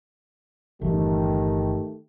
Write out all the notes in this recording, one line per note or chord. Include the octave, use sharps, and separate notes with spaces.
G1 D#3 E3 A3 G4